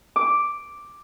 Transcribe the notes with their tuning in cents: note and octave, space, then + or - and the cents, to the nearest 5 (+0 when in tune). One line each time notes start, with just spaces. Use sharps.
D6 +0